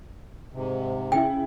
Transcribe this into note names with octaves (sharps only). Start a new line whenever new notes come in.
G#2 C3
C#3 E4 G5